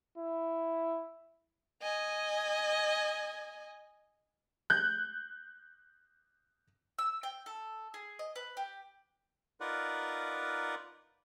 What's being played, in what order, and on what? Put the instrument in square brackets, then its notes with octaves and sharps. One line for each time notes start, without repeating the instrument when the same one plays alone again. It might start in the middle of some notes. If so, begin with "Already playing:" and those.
[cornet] E4
[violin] D#5 G#5
[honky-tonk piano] F#6 G6
[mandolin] E6
G5
A4
G#4
D#5
B4
G4
[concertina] D#4 F4 A#4 B4 D5 F#5